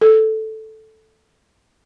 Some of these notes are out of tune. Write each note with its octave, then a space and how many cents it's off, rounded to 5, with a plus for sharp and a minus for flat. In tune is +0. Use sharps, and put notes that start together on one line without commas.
A4 -5